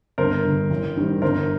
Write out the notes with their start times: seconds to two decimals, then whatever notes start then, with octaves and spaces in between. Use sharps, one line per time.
0.18 G1 A#4 C5
0.44 G2 D3
0.71 A1
0.97 G#2 D#3 G3
1.22 G1 A#4 C5